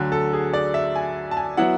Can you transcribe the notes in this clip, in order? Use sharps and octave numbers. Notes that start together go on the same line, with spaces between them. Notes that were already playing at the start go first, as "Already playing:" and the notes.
Already playing: D2 D3 F#3
A4
G#4
D5
E5
G#5
A5
G#5
F#3 B3 E4 F#5